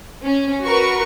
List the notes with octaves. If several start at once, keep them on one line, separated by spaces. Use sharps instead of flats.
C#4
F#4 A#4 B4 C#6